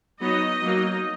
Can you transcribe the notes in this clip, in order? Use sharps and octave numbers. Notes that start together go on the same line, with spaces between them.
F#3 B3 D#4 D#5
F#3 A#3 D#4